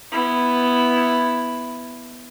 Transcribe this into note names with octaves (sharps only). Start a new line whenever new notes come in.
B3 E4